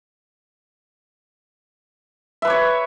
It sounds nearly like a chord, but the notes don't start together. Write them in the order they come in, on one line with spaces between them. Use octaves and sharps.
E5 B4 D6 C#5